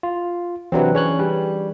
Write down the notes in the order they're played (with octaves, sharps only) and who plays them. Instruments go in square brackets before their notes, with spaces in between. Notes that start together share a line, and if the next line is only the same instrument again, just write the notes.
[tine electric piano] F4
[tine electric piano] C3 F#3 C4 [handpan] E3 D4 B4
[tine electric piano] C#4 C#5 F#6 [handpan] G#4
[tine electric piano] G3